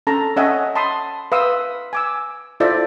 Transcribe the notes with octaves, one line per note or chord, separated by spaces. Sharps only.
C#4 A4 A5 A#5
C#4 C#5 D#5 E5 F#5 G#5
A5 B5 C6 D#6
B4 E5 F5 C6 D#6 E6
G#5 D6 E6
E4 F4 A4 C5 D5 E5